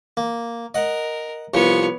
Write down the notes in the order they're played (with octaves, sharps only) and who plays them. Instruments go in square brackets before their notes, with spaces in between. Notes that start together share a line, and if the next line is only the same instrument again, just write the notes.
[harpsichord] A#3
[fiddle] A#4 [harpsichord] D#5 F#5
[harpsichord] C2 F3 [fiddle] B3 C#5